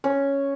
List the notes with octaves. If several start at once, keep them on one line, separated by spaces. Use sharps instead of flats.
C#4